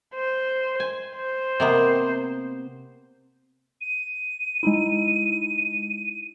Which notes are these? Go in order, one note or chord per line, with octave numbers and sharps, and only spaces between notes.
C5
G#5
C5
C3 A#3 B3
D#7
G#3 D#4 E4